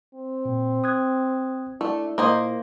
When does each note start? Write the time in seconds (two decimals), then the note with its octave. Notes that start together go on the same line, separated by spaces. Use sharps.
0.14 C4
0.45 A#2
0.84 D#6 F#6 G#6
1.81 A3 D4 E4
2.18 A#2 A#3 C5 D#5